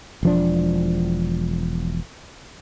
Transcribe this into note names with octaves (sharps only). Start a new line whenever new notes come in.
E1 F3 D4